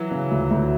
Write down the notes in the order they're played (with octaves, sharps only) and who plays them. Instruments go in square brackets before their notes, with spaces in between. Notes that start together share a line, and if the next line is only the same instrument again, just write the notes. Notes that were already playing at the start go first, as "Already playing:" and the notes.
Already playing: [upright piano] E3 F#3
[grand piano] C#3
D2
D2